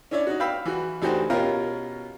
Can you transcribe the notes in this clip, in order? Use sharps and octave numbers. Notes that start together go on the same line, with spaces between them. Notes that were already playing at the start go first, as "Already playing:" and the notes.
C#4 D4 E4 C#5 D5
D#4 F#4
F5 G5 B5 E6
E3 F#4
D2 E3 D#4 F#4 G4 C5
B2 C#4 F4 G4 A#4